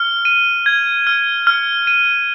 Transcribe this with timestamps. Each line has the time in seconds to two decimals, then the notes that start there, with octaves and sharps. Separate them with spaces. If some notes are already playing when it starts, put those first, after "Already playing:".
Already playing: F6
0.25 D#7
0.66 G#6
1.07 F6
1.47 F6
1.87 D#7